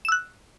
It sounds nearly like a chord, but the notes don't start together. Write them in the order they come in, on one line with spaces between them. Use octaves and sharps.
E7 E6 F#6